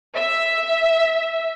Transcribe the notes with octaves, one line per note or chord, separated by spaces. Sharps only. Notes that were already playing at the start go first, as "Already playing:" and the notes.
E5